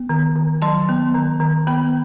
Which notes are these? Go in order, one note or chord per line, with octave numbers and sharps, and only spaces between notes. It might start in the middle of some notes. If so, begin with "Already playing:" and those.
Already playing: B3
D#3
D#3
F#3 A5 C6
B3
D#3
D#3
B3 G5 B5